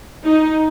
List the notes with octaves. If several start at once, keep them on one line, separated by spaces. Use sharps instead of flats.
D#4